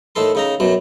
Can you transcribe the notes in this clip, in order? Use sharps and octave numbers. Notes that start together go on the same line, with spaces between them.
A2 D#3 A4 C6
C#3 D#4 A#5
F#2 B2 F#3